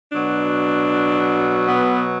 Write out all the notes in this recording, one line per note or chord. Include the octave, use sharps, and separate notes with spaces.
B2 F#3 D4
B3